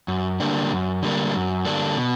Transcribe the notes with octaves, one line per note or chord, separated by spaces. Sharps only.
F#2
D3 G3 A#3 D4
F#2
D3 G3 A#3 D4
F#2
D3 G3 A#3 D4
B2